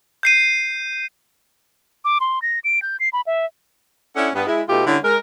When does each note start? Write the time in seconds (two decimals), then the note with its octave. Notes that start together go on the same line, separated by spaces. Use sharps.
0.23 G6 C7 D#7
2.05 D6
2.20 C6
2.42 A#6
2.64 D7
2.82 G6
3.00 C7
3.13 B5
3.27 E5
4.16 C#4 D4 E4 A4 F#5
4.35 G2 B3
4.47 G#3 E4
4.68 B2 A3 D#4 F4 G4
4.86 D3 G3 C#4 E4
5.03 G#3 A#4